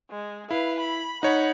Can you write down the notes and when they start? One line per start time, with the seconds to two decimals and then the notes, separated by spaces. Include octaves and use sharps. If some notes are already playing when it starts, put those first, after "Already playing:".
0.11 G#3
0.51 E4 B4 F5
0.80 B5
1.23 D#4 C#5 F#5 B5